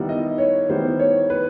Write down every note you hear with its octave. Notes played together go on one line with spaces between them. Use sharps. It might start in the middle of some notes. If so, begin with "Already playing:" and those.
Already playing: D#3 G3 B3 E4
D#5
C#5
D#3 G3 B3 E4 C5
C#5
B4